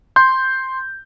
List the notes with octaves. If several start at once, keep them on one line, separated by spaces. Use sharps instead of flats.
C6 G6